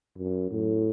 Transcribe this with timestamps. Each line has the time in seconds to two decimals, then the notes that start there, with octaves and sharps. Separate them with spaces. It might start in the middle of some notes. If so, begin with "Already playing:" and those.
0.18 F#2
0.51 A2